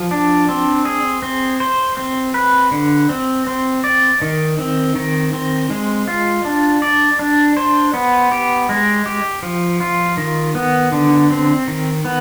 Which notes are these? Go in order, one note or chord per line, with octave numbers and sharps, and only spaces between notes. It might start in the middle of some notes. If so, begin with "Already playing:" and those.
Already playing: F3
D4
C4
G#4
C4
C5
C4
B4
D3
C4
C4
D5
D#3
C4
D#3
C4
G#3
F4
D4
D5
D4
C5
B3
G4
G#3
G4
F3
F4
D#3
B3
D3
C4
D#3
B3